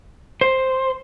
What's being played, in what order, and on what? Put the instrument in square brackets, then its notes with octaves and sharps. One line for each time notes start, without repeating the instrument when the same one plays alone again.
[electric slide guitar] C5